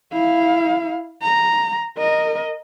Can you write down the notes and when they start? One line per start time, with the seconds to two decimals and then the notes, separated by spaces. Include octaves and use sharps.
0.12 E4 F5
1.22 A#5
1.98 A#4 D#5